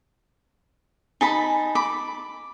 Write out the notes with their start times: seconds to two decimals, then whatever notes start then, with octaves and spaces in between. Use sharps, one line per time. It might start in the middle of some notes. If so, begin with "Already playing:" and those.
1.21 D#4 G#5 A5 B5
1.75 B5 D6